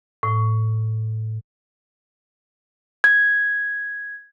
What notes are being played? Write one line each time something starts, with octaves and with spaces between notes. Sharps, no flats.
A2
G#6